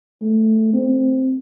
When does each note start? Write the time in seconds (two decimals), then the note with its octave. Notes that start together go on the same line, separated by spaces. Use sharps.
0.22 A3
0.73 C4